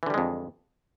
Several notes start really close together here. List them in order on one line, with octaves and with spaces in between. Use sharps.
E3 D3 G3 G#3 F2